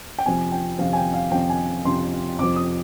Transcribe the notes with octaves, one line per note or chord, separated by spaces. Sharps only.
G5
F2 C3 F3 G#5
G5
F2 C3 F3 F5
G#5
G5
F5
F2 C3 F3 G5
G#5
F2 C3 F3 C6
F2 C3 F3 D6
D#6